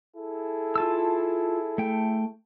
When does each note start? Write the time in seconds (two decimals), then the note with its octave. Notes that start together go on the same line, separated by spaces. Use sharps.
0.16 E4 G#4 A4
0.76 F4 A5 E6
1.78 A3 G5